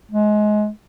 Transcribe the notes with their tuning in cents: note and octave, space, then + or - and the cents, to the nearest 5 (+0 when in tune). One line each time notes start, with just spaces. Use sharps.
G#3 +25